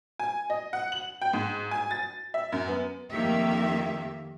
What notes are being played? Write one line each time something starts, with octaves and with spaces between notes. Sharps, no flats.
G#5
D#5
F#5
F#7
G5
G#2
G#5
A6
E5
F#2
B3
F2 D#3 A#3 G4 E5